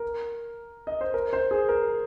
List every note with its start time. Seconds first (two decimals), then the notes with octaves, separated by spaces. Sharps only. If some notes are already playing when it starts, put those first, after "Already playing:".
Already playing: A#4
0.87 D#5
1.01 C5
1.14 A#4
1.33 C5
1.51 G#4
1.69 A#4